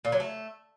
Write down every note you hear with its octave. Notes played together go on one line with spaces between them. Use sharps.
A#2
F#3
A3